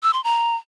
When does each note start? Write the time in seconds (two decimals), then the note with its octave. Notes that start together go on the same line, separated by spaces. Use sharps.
0.03 E6
0.13 C6
0.24 A#5